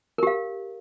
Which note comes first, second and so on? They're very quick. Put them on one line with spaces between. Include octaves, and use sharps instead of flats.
A#4 G4 F5